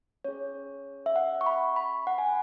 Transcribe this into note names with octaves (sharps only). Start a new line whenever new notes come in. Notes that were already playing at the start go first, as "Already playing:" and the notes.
C#4 G#4 C#5
E5
F#5
C#6
B5
B5
F#5
G#5